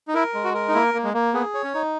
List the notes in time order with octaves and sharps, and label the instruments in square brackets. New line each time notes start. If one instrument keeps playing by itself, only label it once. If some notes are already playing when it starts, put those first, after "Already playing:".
[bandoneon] D#4
[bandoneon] E4 [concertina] A#4
[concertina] G#3
[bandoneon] F#4
[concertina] A#4
[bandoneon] D#4
[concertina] A#3 [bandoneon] E4
[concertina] A#3
[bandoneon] G#3
[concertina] A#3
[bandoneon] B3 [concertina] G#4
[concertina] C#5
[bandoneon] C#4
[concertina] D#4